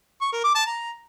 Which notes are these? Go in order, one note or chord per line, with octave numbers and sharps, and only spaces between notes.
C#6
A#4
D6
A5
A#5